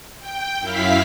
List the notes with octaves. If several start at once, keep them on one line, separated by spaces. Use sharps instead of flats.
G5
F#2 E4 F5 B6